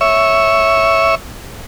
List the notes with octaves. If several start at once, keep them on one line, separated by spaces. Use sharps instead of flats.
C#5 E5